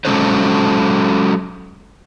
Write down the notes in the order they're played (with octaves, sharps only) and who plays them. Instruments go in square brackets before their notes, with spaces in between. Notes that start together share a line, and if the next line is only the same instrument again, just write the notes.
[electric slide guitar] F#3 G#3 C#4 A4 B4 C5